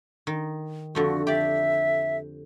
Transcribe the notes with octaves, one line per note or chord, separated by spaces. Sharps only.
D#3
F2 D3 A3 F#4
G4 D5 E5